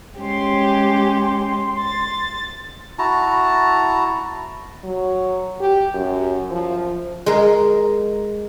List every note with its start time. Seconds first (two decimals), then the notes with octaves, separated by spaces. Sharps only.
0.20 G#3 C#4 G4 C6
1.79 A6
2.99 E4 F#4 A5 A#5
4.85 F#3
5.60 G4
5.94 F#2
6.51 F3
7.26 G#3 A#4